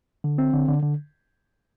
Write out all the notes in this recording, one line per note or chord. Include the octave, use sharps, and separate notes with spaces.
D3
C4
D3
D3
D3